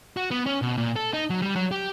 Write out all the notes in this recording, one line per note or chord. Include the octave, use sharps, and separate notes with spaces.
F#4
B3
C#4
B2
A#2
A4
D#4
F#3
G3
F#3
G4